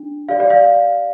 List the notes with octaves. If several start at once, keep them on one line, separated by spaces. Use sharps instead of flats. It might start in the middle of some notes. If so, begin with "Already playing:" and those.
Already playing: D4
G4 D5 F5
D5
F5